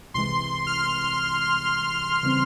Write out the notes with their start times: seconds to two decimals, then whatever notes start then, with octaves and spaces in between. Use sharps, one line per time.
0.14 C2 C3 E3 G#3 C6
0.67 F6
2.23 C#3 E3 G3 C4